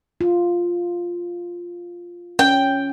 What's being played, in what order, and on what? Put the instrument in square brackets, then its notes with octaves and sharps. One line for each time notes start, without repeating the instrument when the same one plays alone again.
[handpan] F4
[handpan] C#4 [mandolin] G5